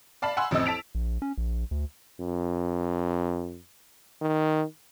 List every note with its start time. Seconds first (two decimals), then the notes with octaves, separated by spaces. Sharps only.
0.22 D5 F5 A5 B5
0.37 F#5 G#5 B5 C6 E6
0.51 A1 F2 C4 D#5 E6
0.66 A5 B6 D7 F7
0.95 A#1
1.22 C#4
1.38 A#1
1.71 D2
2.20 F2
4.21 D#3